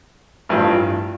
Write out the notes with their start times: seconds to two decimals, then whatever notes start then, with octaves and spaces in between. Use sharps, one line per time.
0.49 A1 G2 F3